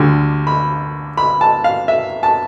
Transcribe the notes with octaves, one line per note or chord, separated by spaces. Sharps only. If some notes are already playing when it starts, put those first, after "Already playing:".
Already playing: D2 D3 G3
B5
B5
A5
F5
E5
A5